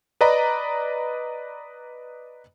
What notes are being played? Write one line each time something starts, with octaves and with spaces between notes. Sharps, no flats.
B4 D5 D#5 A#5 B5